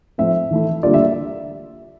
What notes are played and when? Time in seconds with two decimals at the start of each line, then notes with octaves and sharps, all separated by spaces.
0.18 A2 F3 C4 E5
0.51 E3 A3 E4
0.83 D3 G3 A#3 F4 D5
0.94 E5